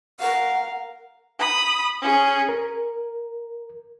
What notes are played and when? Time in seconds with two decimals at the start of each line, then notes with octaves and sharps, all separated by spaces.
0.20 A#4 F5 F#5
1.39 B5 D#6
2.02 C#4 G#4
2.49 A#4